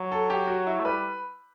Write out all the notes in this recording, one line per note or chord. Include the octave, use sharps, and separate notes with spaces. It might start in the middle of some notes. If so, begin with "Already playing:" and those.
Already playing: F#3
A4
G4
F#4
E4
A3
G3 B4